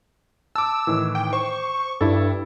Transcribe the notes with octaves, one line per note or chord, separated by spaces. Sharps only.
A5 D6 E6
A2 D#3 E3
G5
C5 C#6
G2 E4 A4